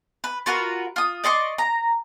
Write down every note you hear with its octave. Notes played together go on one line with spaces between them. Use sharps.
B4
F4 F#4 A#4 B4
F4 D#6
D5 D#5 C6 C#6
A#5